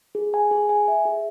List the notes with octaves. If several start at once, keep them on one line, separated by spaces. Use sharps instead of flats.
G#4
G#5
G#4
G#5
E5
G#4